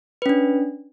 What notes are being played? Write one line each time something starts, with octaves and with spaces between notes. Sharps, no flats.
C#4 D4 B4